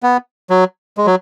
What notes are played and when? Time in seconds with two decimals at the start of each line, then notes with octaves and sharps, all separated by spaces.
0.03 B3
0.50 F#3
0.98 G#3
1.06 F#3